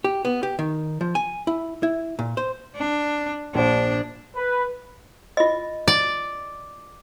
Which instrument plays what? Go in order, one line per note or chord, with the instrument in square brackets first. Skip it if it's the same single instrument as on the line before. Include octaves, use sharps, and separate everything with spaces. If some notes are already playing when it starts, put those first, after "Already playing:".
[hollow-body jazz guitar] G4
B3
G4
D#3
F3
G#5
E4
E4
A#2
C5
[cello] D4
[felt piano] A#1 C5 [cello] D4
[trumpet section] B4
[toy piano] F4 D#5
[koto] D5